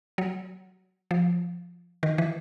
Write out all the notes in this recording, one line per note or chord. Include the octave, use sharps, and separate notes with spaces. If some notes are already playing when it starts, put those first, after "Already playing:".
F#3
F3
D#3
E3